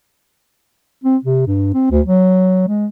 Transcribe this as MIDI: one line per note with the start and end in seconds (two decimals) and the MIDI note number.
1.04 1.17 60
1.24 1.44 48
1.47 1.70 43
1.74 1.86 60
1.91 2.01 38
2.06 2.65 54
2.68 2.87 56